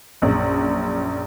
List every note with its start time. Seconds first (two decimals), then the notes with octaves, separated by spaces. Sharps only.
0.22 A#1 F#2